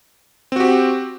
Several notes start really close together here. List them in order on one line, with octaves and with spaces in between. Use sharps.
C4 F#4 G4